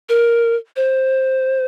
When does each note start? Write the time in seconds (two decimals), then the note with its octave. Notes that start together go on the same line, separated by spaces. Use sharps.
0.09 A#4
0.76 C5